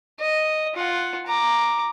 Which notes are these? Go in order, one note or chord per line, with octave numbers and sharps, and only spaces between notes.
D#5
F4 F#5
A#5 D6